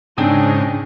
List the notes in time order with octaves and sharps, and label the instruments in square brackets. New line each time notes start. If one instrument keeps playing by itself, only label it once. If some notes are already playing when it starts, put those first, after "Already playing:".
[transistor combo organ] G#2 C#3 D#4 [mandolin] C4 G#4 D#6 [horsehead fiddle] D4